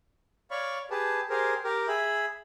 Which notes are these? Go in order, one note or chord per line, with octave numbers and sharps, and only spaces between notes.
C#5 D5 F5 B5 C#6
G4 G#4 B4 A5
G4 G#4 A#4 C5
G4 A#4
G#4 E5 B5